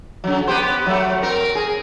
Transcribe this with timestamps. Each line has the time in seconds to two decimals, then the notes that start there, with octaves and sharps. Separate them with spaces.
0.24 C#3 F#3
0.47 B3 G4 C5
0.86 F#3 A3
1.22 C4 A#4
1.55 G#4